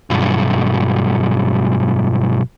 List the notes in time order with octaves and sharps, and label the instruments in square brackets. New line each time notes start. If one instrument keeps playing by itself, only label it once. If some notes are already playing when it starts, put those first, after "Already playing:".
[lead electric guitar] B1 G2